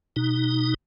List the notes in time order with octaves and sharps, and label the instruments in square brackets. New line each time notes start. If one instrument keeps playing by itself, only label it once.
[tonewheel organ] B2 D#4